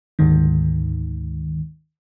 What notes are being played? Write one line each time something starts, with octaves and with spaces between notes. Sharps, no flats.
D2 G#2 D#3